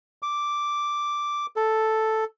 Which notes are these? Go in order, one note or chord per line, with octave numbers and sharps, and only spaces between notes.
D6
A4